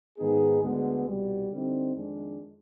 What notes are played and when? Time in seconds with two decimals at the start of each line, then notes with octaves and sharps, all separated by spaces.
0.18 G#2 D#3 B3 D#4 G#4
0.63 D2 D3 G#3 B3
1.07 C2 B2 G3
1.51 D3 G3 C4 D#4
1.95 F2 D#3 G#3 D4